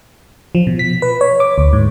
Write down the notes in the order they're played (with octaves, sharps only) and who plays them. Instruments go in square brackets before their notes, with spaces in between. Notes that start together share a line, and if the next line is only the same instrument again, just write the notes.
[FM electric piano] F3
B2
B6
B4
C#5
D6
D2
G#2